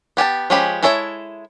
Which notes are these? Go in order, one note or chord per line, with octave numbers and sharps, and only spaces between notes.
B3 G4 G#5 A5
F3 G#3 C#4 G4 B5
G#3 E4 A4 C#5 E5